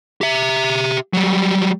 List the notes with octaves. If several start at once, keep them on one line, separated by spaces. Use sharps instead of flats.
G4 E5
F#3 G3